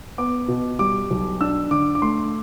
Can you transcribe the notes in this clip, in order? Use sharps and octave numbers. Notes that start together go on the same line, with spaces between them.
B3 D6
B2
G3 D6
B1
D4 E6
D3 D6
D6
A3 C6